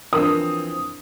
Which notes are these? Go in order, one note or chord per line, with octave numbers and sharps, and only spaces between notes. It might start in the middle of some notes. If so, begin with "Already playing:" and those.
E3 F3 C4 D4 A#4 D#6